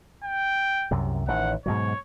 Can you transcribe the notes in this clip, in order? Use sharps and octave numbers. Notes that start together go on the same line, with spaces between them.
G5
C2 F#2 C3
A1 D#3 F#5
G#2 B2 F#3 C#5